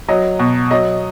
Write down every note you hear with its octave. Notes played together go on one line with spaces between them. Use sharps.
F#3 D#5
B2
F#3 D#5